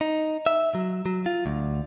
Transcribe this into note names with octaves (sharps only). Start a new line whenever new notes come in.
D#4
E5
F#3
F#3
F4
D2